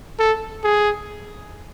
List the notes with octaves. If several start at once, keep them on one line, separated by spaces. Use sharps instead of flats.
A4
G#4